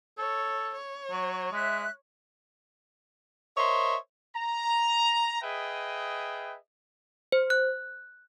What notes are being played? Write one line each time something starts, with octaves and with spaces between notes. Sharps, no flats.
A4 C#5
C#5
F#3
G#3 E5 F#6
A#4 C5 C#5 D#5 E5
A#5
G#4 B4 D#5 E5 G5
C5
F#6